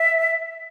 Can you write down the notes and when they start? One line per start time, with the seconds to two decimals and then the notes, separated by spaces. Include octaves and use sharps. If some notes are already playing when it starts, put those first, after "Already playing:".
Already playing: E5